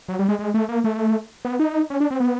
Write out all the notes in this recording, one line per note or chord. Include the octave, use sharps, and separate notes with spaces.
F#3
G3
G#3
G#3
A3
A#3
A3
B3
D#4
C#4
D4
C4
B3